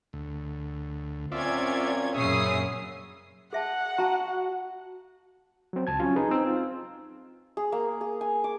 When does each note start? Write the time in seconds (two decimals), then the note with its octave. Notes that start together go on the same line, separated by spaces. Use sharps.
0.13 D2
1.32 F#2 A#2 C4 C#4 F4 D5 E5 G#6
2.14 F#2 A#2 C#3 C#4 C#5 E5 D#6 C7
3.53 G#4 E5 F#5 A5
3.98 F#4 A5 A#5
5.73 F#3 C4
5.87 C#2 A5 G#6
6.00 F#3 C#4 F4
6.16 D#4 G#4 B4
6.31 C4 E6
6.45 F4
7.57 G#4
7.72 A#3
8.01 G#4
8.21 G#5
8.44 D6